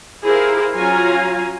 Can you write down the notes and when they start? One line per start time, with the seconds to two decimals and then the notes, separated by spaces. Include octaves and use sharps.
0.23 E4 G4 G#4 A#4 C5 F5
0.74 F#3 C#4 F4 F5 G#5 A#5